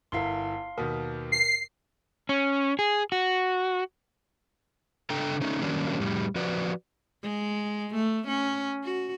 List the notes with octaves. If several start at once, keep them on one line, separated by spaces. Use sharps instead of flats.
G1 E4 A#4 F5 C6
D#2 B2 A#4
C7
C#4
G#4
F#4
C#3 D4 A4 G5 A#5
A3 C#4 D#4
D#3 F#3 G3 A#3 C#4 D4
F2 A2 G3
F3 F#4 B4 D5
G#3
A3
C#4
F#4